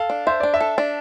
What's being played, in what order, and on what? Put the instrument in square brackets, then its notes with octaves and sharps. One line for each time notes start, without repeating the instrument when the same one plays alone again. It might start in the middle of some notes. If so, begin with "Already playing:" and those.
Already playing: [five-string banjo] A4 [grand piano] F5
[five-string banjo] D4
[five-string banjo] C5 [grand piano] E5
[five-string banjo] D4 [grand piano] D5
[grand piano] E5
[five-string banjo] A4
D4